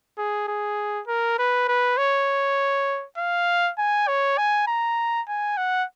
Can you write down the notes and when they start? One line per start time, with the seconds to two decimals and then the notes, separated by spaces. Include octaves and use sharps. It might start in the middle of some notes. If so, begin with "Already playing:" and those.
0.18 G#4
0.48 G#4
1.07 A#4
1.39 B4
1.68 B4
1.98 C#5
3.18 F5
3.78 G#5
4.08 C#5
4.38 G#5
4.67 A#5
5.28 G#5
5.57 F#5